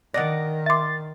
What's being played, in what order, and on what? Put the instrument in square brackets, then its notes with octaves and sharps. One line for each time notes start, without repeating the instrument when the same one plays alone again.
[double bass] D#3 [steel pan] D5 D#5 F#5 [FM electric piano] A#6
[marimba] E5 D6 [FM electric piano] C6 A6